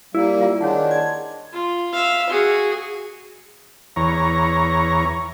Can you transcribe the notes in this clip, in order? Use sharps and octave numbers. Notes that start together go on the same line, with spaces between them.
G3 A#3 E4
F4 G4 F5
D#3 G#3 D4 C#5 F#5 A5
G#6
F4
E5 F5
F#4 G#4
E2 C#5 A#5